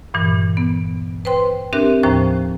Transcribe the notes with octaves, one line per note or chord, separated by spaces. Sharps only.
G2 A#2 E3
B3
B4 C5 G5 C6
C4 D4 G4 A#4 E5 F#6
D#2 A2 F3 C5 A#5